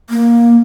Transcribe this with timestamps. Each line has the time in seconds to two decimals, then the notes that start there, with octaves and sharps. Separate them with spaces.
0.10 A#3